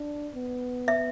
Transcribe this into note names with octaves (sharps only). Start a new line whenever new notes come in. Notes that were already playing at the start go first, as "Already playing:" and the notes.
Already playing: D4
B3
E5